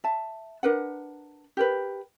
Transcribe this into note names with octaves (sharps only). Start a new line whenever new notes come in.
E5 A5
D4 A#4 B4 F#5
G4 A#4 B4